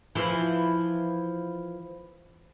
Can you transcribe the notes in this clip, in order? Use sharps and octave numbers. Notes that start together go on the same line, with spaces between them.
E3 F3